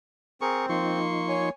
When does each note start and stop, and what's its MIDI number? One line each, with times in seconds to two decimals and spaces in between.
0.41 0.99 60
0.41 0.66 68
0.41 0.66 70
0.41 0.66 85
0.69 1.50 53
0.69 1.49 58
0.69 1.50 63
0.69 1.49 84
0.69 1.49 85
1.29 1.49 73
1.29 1.49 80